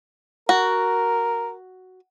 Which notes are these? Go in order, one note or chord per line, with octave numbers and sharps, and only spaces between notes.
F#4 A#4